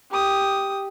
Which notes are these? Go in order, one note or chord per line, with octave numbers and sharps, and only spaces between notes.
G4 D#6